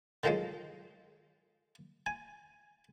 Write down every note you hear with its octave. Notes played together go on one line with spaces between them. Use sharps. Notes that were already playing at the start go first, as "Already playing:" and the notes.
D3 D#3 F3 F#3 G#3
G#5